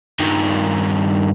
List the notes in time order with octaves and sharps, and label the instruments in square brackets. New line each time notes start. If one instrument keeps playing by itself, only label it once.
[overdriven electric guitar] G2 D#3